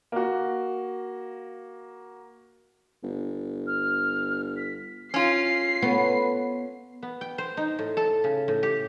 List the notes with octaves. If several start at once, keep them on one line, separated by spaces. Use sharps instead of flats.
A#3 F#4
G1
F6
B6
C#4 F4 C7
B3 A4 B4 C#5
B3
G5
C5
D#4
A2
A4
C#3
A2
G4